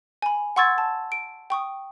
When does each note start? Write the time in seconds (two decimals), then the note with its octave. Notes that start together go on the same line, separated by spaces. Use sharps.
0.22 G#5 B5
0.56 F#5 C6 C#6 E6 G#6 A6
0.78 A5
1.12 D7
1.50 G5 C#6 D#6